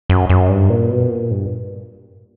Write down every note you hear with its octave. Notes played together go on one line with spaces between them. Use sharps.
F#2
F#2
G2
A#2
B2
A#2
G2